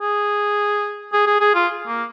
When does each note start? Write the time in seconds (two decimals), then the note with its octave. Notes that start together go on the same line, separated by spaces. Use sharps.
0.01 G#4
1.13 G#4
1.27 G#4
1.41 G#4
1.55 F4
1.87 A#3